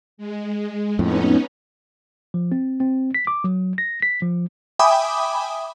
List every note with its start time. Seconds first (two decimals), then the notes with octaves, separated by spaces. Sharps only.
0.17 G#3
0.99 F2 A2 B3 C#4 D#4
2.34 F3
2.52 C4
2.80 C4
3.14 B6
3.27 D6
3.44 F#3
3.78 A#6
4.02 B6
4.22 F3
4.79 E5 G5 G#5 B5 D6 D#6